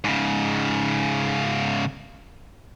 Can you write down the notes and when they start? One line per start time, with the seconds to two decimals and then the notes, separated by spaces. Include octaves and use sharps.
0.04 G#2 C#3